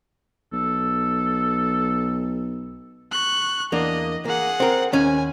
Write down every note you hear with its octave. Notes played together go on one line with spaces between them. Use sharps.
B1 A4
C#6 F#6
E2 A#3 D4 D#5
A#3 G#4 F#5
C4 A#4
D#2 C#4 G#5